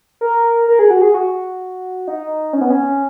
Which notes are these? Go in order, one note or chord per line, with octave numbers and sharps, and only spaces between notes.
A#4
A#4
G#4
F#4
G#4
F#4
D#4
C#4
B3
C#4